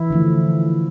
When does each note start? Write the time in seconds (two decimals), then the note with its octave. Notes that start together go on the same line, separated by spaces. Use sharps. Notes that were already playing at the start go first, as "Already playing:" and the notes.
Already playing: E3 E4
0.10 D3 F3 A3